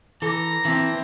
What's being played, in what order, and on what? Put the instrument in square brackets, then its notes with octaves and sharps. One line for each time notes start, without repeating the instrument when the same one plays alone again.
[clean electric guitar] E3 [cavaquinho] A4 C#6 D6 [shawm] A#5
[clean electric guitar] E3 [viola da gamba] C4 [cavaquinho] E4 A5